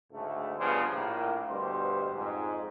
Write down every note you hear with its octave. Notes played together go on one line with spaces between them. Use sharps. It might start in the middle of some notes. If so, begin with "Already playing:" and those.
D2 G#2 C#3 A3
G2 C#3 F3 B3 D4 C5
A#1 A2 A#3
D2 G2 B2 G3 C5
F2 G#2